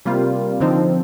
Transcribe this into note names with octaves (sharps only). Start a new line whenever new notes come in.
C3 G3 A#3 F4
D3 F3 C4 D#4